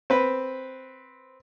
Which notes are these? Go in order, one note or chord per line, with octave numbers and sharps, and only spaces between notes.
C4 B4